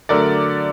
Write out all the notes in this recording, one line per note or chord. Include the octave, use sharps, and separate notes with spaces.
D3 F#3 A3 A#4 D5